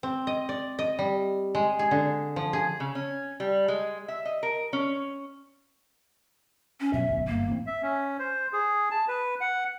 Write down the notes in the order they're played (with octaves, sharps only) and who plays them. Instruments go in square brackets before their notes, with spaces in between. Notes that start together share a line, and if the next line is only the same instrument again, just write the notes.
[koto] C4
D#5
D5
D#5
G3
G#3
G#4
D3
F3
G#4
[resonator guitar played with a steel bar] C#3
C#4
G3
G#3
E5
D#5
A#4
C#4
[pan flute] C#4
[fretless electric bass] B2 F#3 C#4 [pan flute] E5
[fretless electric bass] D1 B1 B2
[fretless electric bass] G1 [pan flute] A#3
[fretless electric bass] A1 C4
[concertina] E5
C#4
C5
G#4
A5
B4
F#5